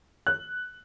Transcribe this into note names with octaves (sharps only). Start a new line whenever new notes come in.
F#6